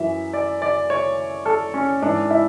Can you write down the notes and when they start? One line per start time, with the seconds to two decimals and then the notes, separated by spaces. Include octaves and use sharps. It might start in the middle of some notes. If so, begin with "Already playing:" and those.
Already playing: F#2 E3 E5
0.33 D5
0.62 D5
0.90 C#5
1.46 A4
1.74 C#4
2.02 G#2 E3 D4
2.30 E4